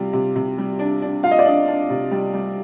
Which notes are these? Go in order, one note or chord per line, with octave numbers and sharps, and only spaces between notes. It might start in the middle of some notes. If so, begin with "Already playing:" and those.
Already playing: C3 G3 F4
C3
C3
G3
D4
D4
F4 F5
D#5
D5
D4 D#5
D4
C3
G3
G3